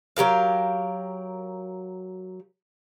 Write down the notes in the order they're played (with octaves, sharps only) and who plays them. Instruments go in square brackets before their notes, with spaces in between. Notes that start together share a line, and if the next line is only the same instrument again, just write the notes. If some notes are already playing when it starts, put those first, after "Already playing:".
[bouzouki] F#3 G4 A#4 F5